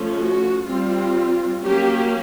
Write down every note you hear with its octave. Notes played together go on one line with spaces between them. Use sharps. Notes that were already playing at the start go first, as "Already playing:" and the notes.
Already playing: F3 A3 C#4
F#4
G3 C4 F4
F#3 A#3 C#4 G4